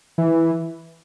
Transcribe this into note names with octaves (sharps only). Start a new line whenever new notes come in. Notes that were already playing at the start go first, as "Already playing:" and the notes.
E3